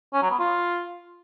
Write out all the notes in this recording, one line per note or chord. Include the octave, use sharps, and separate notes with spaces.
C#4
F#3
B3
F4